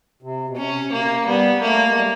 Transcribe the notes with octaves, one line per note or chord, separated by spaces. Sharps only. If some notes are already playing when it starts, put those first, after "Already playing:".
C3
B2
C3 C#4
C3 A#3
B2
C3
G3 B3
A3 A#3
G#3
G3